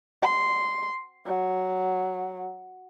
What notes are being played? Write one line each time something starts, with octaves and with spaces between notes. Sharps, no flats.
C6
F#3